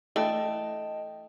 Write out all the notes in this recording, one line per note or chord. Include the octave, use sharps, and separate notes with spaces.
E3 A3 D4 D#5 G5 A5